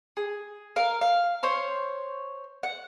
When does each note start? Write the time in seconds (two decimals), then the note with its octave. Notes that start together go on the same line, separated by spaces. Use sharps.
0.17 G#4
0.76 A#4 F5
1.01 F5
1.43 C5 C#5 C6
2.63 F#5